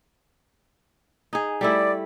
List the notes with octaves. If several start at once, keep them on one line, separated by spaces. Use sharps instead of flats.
D#4 G#4
G3 A3 E4 D5